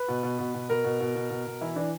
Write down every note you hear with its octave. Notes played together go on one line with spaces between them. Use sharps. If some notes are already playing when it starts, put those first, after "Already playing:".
Already playing: B4
B2
B2
B2
B2
B2 A#4
B2
B2
B2
B2
B2
E3 E4
E3 D4